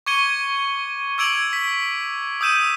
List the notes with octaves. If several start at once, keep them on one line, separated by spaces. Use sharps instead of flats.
C#6 D6 G#6 C#7 D#7 G7
D6 E6 G#6 D7 F7 F#7
B6
D#6 E6 G6 D#7 E7